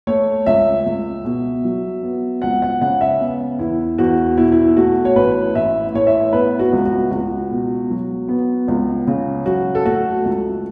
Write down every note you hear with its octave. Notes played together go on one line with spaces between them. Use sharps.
A3 C#5
C#2 E5
C#2
B2
F#3
B3
C#2 F#5
F#5
C#3 F#5
E5
B3
E2 E4
E2 F#4
B2 E4
E4
A3 F#4
C#5
A1 B4
A1 E5
A2 C#5
E5
B3 B4
F#4
C#2
F#4
C#2 F#4
B2
F#3
B3
C#2
C#3
F#3 F#4
A4
A3 F#4
C#2